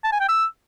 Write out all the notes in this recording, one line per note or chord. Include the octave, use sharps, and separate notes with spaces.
A5
G#5
G5
E6